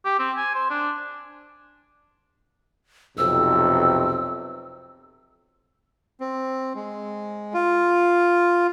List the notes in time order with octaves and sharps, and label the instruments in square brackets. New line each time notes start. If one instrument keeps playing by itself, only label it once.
[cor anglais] G4
C4
G#5
C5
D4
[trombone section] B1 F2 C3 [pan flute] E6
[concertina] C4
G#3
F4